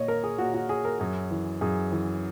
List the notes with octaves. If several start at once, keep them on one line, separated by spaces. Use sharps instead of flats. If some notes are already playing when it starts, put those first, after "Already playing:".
Already playing: A#2 C#5 D#5
A#4
G#4
A#2 F#4
F#4
G#4
A#4
F#2 G#4
E3
F#2 G#4
E3